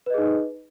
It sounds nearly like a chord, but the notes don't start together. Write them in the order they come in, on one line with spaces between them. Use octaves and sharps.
B4 D#5 G#4 D#4